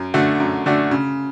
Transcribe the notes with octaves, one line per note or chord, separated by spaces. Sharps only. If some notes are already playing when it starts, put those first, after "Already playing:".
Already playing: F#2
D3 A3 D4 F#4
F#2
D3 A3 D4 F#4
C#3